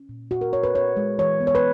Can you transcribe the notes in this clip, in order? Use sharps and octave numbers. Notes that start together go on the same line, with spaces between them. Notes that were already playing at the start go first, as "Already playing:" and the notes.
Already playing: C#4
A#2
A#2 F#4
A#4
C#4 C#5
B4
B3 C#5
G#3
E3 C#5
B3
C#5
B4